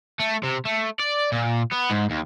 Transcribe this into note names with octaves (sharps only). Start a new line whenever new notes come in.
A3
C3
A3
D5
A#2
B3
G#2
D#2